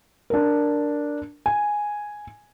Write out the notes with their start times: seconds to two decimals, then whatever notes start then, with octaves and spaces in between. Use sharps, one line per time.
0.30 D4 A#4
1.46 G#5